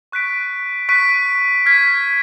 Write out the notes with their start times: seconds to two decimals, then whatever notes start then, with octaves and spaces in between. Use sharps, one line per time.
0.12 C#6 F#6 B6 D7
0.89 C#6 F#6 B6 D7
1.66 F6 G#6 B6